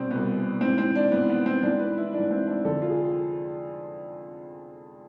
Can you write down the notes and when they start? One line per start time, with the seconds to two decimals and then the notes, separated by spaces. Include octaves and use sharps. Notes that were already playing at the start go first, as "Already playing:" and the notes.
Already playing: C2 B2 C4 D4
0.11 C2 B2 B3
0.61 G#2 E3 C4
0.78 C4
0.95 D4
1.12 G#2 E3 B3
1.29 B3
1.46 C4
1.63 G#2 E3 D4
1.79 B4
1.97 E4
2.13 G#2 E3 D4
2.31 C4
2.47 D4
2.65 F2 D3 A4
2.82 F4
2.90 G#4